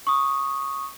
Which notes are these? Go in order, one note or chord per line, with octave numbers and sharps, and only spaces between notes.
C#6 D#6